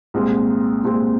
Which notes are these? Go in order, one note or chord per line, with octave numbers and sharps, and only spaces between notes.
C2 A#2 G#3 C4
C2 A#2 G#3 C4